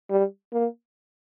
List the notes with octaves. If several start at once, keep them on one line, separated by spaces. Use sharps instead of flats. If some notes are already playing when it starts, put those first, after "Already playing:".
G3
A#3